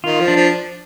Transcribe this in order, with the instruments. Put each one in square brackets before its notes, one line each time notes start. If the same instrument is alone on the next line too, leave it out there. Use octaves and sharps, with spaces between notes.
[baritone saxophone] D#3 [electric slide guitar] F4
[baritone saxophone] F3
[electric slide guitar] D4
[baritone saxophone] F3